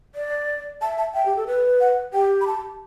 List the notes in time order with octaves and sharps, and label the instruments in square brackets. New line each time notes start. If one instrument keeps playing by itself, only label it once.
[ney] D5
[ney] E5 [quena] A5
[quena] A5
[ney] E5 [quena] G5
[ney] G4
A4
B4
[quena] F#5
[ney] G4 [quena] G5
[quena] B5
A5